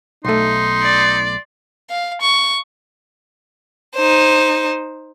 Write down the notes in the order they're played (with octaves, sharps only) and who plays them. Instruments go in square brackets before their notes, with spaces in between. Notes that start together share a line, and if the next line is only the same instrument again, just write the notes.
[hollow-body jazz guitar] B1 A3 [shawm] D#4 [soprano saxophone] C6
[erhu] D5
[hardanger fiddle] F5
C#6
[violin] D#4 C5